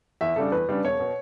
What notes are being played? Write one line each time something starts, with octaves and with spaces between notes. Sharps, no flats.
E2 E5
C#3 G3 D4 A4
E2 B4
C#3 G3 D4
E1 C#5
B2